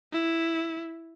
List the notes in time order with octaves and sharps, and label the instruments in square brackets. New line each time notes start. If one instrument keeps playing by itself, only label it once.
[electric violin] E4